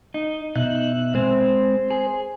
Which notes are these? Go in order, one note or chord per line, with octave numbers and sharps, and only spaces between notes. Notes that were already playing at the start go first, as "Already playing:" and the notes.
D#4
B2 D#4 E5 F#6
G#3 C4 C5
G#4